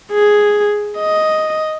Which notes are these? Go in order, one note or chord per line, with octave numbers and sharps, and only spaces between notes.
G#4
D#5